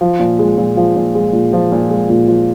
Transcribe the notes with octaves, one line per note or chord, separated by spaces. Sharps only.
F3
A#2
G#3
A#2
F3
A#2
G#3
A#2
F3
A#2
G#3
A#2
F3